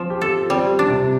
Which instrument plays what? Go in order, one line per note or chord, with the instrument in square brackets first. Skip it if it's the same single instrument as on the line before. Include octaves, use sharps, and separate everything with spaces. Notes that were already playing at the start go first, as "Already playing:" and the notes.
Already playing: [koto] F3 [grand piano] C4 F4
[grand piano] G4
[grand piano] F4 [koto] A4
[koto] G3 [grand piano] C4
[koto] D4
[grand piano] C3